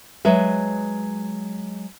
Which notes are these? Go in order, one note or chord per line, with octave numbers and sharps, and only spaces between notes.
F#3 G#3 B4 E5